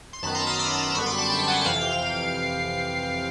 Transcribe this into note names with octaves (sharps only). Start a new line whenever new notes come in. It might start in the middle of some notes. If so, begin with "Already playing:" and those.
C6
F#2 D#3 F#3 B3 A5 B5
A#5 C6
D#6 F6
D6 E6
C6 D6
A#5 C6
F#2 D3 G3 B3 B5 C#6
C6 D6
A5 B5
G5 A5
F#5 G#5
F#5
F2 C3 E3 F5 G5